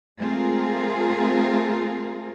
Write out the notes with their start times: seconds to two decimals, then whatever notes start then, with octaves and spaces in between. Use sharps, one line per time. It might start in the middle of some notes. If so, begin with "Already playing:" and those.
0.18 G#3 A3 C4 F4 G#4 A#4